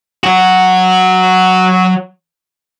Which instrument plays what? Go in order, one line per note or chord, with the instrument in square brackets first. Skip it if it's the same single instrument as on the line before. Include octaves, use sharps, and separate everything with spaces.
[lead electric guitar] F#3 F#4